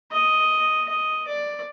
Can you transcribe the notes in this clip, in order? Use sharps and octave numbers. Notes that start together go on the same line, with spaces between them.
D#5
D#5
D5